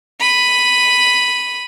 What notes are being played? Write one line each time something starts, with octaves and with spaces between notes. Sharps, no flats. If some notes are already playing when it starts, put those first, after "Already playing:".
B5 D#7